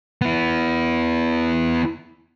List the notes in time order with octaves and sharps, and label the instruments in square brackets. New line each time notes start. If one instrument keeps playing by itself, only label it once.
[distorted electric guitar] B3 E4